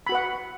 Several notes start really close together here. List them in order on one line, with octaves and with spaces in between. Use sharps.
B5 F#4 B4 F#5